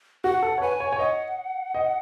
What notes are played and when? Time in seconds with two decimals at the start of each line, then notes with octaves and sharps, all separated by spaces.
0.24 F#4 F#5
0.42 A4
0.58 C#5
0.62 B4 G#5
0.80 C#5
0.92 C#5
0.99 D#5 F#5
1.75 D#5